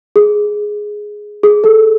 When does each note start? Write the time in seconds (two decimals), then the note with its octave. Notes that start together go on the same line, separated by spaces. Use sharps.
0.16 G#4
1.43 G#4
1.64 A4